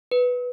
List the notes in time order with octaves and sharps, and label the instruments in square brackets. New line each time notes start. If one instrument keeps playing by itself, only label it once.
[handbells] B4